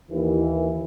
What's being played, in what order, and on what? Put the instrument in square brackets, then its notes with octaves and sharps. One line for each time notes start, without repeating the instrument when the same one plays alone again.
[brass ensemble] D#2 E3